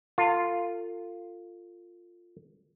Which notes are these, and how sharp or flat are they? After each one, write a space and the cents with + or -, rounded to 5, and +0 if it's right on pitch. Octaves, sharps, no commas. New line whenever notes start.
F4 +0 A4 +35